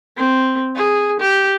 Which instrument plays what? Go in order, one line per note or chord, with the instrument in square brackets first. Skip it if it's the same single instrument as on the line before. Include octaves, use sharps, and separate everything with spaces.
[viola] C4
G#4
G4